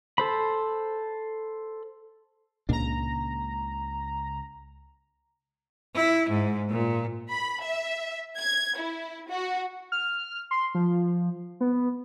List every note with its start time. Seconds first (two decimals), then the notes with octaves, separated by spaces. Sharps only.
0.18 A4 C5 B5
2.69 C#2 A#2 A#3 D4 A#5
5.94 E4
6.29 G#2
6.69 A#2
7.30 B5
7.63 E5
8.39 G#6
8.78 E4
9.30 F#4
9.92 F6
10.51 C6
10.75 F3
11.61 B3